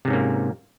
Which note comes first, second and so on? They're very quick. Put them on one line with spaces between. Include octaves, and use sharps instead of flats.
C3 G#2 C#4 A#3